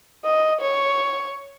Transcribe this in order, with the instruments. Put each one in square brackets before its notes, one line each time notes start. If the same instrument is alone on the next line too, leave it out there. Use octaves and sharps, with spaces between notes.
[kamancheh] D#5
C#5